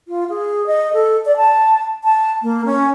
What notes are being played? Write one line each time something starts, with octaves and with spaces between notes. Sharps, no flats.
F4
G#4
D#5
A4
D5
A5
A5
A#3
C#4